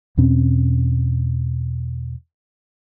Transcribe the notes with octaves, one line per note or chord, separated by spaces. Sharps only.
E2 B2 C4 C#4